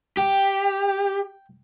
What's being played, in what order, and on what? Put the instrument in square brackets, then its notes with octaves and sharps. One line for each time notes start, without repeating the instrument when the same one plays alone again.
[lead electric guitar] G4 [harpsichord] G5